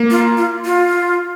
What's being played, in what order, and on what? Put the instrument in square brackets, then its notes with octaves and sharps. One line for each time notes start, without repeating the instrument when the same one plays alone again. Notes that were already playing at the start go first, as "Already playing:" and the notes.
Already playing: [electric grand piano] A#3
[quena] F4
F4
F4